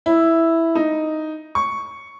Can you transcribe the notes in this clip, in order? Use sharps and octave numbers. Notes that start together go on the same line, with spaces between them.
E4
D#4
C#6